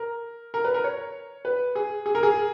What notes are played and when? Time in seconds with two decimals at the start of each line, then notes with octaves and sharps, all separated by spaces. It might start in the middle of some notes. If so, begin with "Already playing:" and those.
Already playing: A#4
0.54 A#4
0.64 B4
0.74 A#4
0.84 C#5
1.45 B4
1.75 G#4
2.06 G#4
2.15 A#4
2.23 G#4